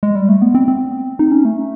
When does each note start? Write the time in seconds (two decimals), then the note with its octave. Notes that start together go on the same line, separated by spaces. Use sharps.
0.03 G#3
0.15 G3
0.29 A3
0.42 B3
0.54 C4
0.68 C4
1.19 D#4
1.32 C#4
1.45 A3